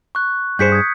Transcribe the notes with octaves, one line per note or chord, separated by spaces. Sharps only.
C#6 F#6
G2 G#4 C5 G6 B6 C#7
D#6 G#6